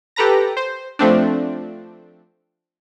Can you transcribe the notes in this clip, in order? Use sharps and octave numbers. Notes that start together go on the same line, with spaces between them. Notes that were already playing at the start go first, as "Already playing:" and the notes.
G4 A4 B4 A#5 A#6
C5
F3 A3 C4 D4